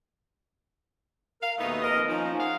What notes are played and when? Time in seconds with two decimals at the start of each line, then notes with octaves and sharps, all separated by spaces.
1.42 A#4 F5
1.58 D#2 B2 A3 B3 D#4 D#6
1.83 F2 A#4 D#5
2.09 F3 A#3 C#4 D#4
2.39 F4 G#4 F5 F#5